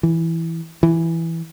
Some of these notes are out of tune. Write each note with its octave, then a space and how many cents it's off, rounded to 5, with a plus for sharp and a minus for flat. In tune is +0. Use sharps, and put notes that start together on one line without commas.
E3 +0
E3 +5